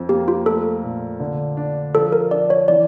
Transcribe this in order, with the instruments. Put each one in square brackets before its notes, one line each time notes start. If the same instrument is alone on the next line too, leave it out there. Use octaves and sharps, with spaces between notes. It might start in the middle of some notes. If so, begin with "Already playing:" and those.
Already playing: [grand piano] F2
[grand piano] A#3 [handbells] G4
[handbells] F4
[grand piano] A3 [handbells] A4
[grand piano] A#2
D3
D4
[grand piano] F3 [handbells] A4
[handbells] A#4
[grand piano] D4 [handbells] D5
[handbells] C#5
[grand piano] E3 [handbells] D5